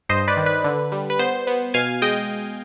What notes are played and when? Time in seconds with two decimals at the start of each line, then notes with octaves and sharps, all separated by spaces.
0.09 G2 C5 D#5
0.28 B4 D5
0.37 D#3
0.46 B4
0.64 D3
0.92 G3
1.10 B4
1.19 B3 C5
1.47 B3
1.74 B2 F5 G#5
2.02 G#3 D#5 G5